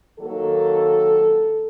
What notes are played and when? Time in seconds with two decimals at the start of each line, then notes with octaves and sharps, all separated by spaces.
0.19 D#3 F#3 A#3 A4